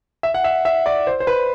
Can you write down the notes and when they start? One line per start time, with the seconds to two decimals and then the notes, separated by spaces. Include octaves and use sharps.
0.23 E5
0.34 F#5
0.44 E5
0.65 E5
0.86 D5
1.07 C5
1.20 C5
1.27 B4